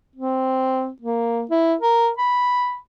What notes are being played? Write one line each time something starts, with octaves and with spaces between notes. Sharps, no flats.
C4
A#3
E4
A#4
B5